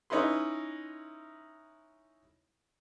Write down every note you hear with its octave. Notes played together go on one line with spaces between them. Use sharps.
C#4 D#4 E4 B4 C6